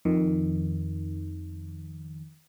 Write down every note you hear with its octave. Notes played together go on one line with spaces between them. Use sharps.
F2 D#3